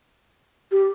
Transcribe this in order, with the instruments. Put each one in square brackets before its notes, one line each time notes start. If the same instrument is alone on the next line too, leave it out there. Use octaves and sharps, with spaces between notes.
[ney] G4